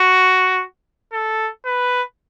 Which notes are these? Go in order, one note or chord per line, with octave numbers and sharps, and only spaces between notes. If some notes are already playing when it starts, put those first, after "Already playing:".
Already playing: F#4
A4
B4